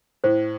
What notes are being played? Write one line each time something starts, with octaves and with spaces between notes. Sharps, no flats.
A2 C5